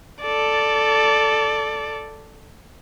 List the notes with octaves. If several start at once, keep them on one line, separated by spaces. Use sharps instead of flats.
A4 D5